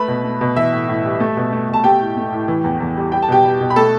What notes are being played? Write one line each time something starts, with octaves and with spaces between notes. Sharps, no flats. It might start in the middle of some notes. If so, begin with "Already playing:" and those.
Already playing: A3 B4 B5
B2
A3
B2
E3 E5
A2
A2
G3
A3
B2
A3
B2 A5
A3 G4 G5
A2
A3
A2
E3
E2
E2
G3
G3 G5
A5
B2 G4 G5
G3
B2
B5
A3 A4 A5